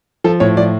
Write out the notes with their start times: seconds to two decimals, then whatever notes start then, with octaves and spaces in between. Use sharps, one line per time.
0.24 F3 A4
0.40 A2 C#5
0.57 F3 D5